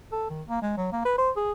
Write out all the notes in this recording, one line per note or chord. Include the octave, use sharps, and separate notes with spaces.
A4
D#3
A#3
G#3
F#3
A#3
B4
C5
G#4